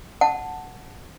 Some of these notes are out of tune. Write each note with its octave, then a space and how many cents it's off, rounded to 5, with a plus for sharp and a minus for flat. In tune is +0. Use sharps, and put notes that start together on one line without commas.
F#5 +0 A5 +0